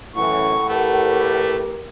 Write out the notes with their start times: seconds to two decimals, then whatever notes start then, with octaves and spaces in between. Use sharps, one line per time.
0.16 F#2 A2 E3 F#5 C#6
0.69 A3 G4 A#4 B4